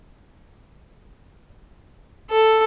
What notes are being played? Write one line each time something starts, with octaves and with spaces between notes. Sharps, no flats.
A4